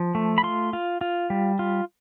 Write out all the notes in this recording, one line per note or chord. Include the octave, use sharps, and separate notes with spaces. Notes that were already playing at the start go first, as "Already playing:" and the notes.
Already playing: F3
A3
B5
F4 C6
F4
F4
G3
F4